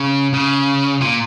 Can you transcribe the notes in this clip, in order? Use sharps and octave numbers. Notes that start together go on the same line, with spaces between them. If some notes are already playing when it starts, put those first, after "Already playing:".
Already playing: C#3
C#3
A#2